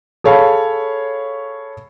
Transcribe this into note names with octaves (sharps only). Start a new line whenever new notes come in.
G#4 A4 C#5 F5 B5